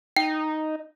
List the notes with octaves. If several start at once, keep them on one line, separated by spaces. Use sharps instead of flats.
D#4 G5